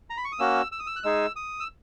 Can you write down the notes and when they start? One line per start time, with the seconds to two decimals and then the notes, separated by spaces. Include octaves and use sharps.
0.10 A#5
0.17 B5
0.25 C#6
0.32 D#6
0.39 A#3 C#4 F#4 E6
0.72 E6
0.80 D#6
0.87 E6
0.96 F#6
1.03 G#3 D#4 G#4 E6
1.36 D#6
1.60 E6